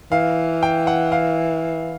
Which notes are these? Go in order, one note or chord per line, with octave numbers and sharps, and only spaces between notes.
E3 F5
G5
F#5
F5